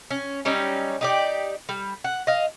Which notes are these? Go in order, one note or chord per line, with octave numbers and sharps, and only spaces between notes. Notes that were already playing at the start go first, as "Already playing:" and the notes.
C#4
F#3 G3 C#4 D#4
D#4 G4 D5
G3
F#5
D#5 F5